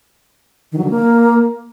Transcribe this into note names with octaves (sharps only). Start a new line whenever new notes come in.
D#3
F#3
D3
A#3